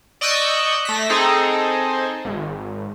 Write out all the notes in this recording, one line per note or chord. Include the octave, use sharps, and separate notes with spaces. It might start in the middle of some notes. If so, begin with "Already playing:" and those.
D5 D#5 C#6 E6 F#6 G6
A3 A#6 B6
C4 D#4 G#4 A4
G#1